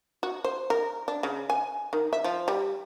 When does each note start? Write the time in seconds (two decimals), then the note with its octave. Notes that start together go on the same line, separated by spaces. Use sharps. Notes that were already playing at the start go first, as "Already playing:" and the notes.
0.23 F#4
0.44 C5
0.70 A#4
1.08 D4
1.23 C#3
1.50 G#5
1.93 D#3
2.13 E5
2.24 F3
2.48 G3